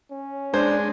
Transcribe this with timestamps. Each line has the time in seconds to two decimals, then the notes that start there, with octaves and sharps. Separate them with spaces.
0.12 C#4
0.54 G#3 D4 C5